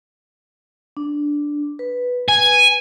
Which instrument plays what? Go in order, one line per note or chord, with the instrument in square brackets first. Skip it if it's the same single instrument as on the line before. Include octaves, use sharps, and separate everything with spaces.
[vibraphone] D4
B4
[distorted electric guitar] G#5